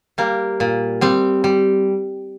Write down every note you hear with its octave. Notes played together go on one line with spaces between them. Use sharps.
G3 A#3
A#2
G3 C4
G3